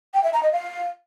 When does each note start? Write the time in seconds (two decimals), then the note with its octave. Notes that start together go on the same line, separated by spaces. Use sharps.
0.14 G5
0.24 E5
0.33 A#5
0.43 D#5
0.53 F5